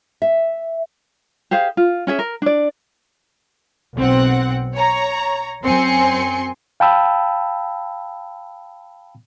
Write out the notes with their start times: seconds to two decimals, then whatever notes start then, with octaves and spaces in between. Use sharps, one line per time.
0.22 E5
1.51 G4 G#4 C5 F5
1.77 F4
2.07 C#4 G#4 E5
2.19 A#4
2.42 D4 D5
3.95 B1 C4 F#5
4.75 C#5 A#5
5.64 F#2 C4 G#5 C6 C#7
6.80 F5 G5 A5 B5 E6